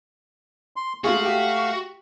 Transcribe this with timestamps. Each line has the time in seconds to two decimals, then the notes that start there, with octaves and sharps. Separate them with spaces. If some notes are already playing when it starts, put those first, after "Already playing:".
0.76 C6
1.04 G#3 A3 F4 F#4 G#4 F5
1.25 G4